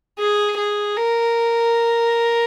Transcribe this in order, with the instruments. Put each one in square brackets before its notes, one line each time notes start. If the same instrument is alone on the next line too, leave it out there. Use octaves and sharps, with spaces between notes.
[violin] G#4
G#4
A#4